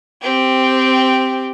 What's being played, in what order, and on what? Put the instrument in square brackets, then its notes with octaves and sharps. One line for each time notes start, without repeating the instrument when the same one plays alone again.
[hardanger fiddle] C4 G4